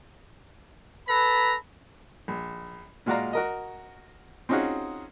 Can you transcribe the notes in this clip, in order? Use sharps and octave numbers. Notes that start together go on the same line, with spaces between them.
A4 B4 A#5 B5
A#1
A#2 G#3 F#4 D5 F5 A#5
F#4 A#4 D#5
C4 C#4 D#4 F4 F#4 G#4